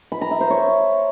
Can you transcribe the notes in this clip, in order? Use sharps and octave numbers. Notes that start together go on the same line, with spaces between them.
B5
A#5
E5
C5
C#5